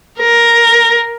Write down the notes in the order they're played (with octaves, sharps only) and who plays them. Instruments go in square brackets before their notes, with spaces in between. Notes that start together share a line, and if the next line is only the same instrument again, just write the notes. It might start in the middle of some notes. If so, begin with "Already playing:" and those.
[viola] A#4